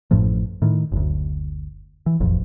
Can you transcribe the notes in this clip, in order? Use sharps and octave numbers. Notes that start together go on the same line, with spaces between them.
A1 F#2 A2 F3
A2 D#3
F#1 D2
E3
E1 A1 F2